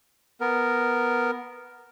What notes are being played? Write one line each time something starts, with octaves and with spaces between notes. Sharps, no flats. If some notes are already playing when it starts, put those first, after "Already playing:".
B3 A#4